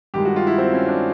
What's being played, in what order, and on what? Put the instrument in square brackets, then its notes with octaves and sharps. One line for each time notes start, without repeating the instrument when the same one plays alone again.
[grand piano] G2 D#3 G#3 G4
F#4
F4
E4
C4
C#4
D4